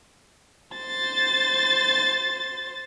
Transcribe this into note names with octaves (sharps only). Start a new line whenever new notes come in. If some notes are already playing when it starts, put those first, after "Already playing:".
C5 A6